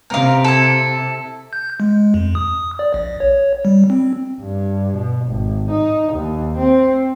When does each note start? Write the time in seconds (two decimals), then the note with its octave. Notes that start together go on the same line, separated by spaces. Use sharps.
0.10 C3 A#4 F5
0.44 E4 A4
1.53 G6
1.80 G#3
2.14 F2
2.35 D#6
2.79 D5
2.94 A#1
3.20 C#5
3.65 G3
3.90 C4
4.40 G2
4.95 B2
5.25 G#1
5.71 D#4
6.13 D#2
6.57 C4